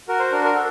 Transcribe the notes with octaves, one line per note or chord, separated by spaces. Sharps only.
F#4 A#4
C5
D4 A#4
A#4
A4